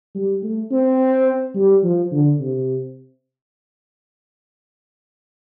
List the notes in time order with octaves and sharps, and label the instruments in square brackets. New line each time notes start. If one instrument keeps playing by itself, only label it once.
[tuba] G3
A3
C4
G3
F3
D3
C3